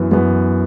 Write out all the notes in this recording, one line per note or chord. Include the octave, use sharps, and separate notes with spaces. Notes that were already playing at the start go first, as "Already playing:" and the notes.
Already playing: F#2 E3 B3
F#2 E3 B3